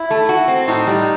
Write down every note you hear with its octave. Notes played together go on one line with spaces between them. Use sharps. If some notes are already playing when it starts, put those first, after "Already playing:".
Already playing: E4
A3
F#4
C4
A2 D#4
G3